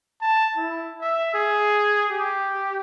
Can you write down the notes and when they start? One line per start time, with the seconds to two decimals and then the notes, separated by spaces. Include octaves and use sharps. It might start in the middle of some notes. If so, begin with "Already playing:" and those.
0.22 A5
0.57 E4
1.01 E5
1.34 G#4
2.10 G4